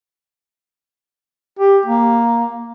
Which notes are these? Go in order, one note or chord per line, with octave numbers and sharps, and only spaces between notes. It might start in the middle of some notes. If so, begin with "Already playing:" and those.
G4
A#3